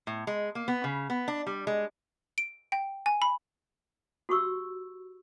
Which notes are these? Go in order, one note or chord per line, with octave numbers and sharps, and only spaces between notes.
A2
G#3
A#3
B3
C#3
B3
D4
G3
G#3
D7
G5
G#5
B5
F#4 G4 C#6 E6